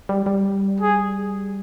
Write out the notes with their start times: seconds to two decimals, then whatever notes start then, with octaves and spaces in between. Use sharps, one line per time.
0.09 G3
0.26 G3
0.80 G#4